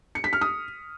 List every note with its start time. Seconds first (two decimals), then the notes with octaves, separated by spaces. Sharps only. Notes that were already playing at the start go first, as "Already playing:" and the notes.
0.15 C#7
0.24 B6
0.33 F6
0.41 D#6